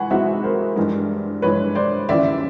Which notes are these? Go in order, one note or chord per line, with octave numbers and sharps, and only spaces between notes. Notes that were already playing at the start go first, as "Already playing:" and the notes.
Already playing: E3 G#3 F#5 G#5 B5 C#6
E3 G#3 C4 D#4 F#4 E5 F#5
A#4 C5
G2 E3 G#3
G2 E3 G#3 B4 C#5
C5 D5
D#2 C#3 E3 D5 E5